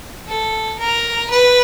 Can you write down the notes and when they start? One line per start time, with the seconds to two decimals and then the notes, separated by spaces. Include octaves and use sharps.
0.27 A4
0.79 A#4
1.30 B4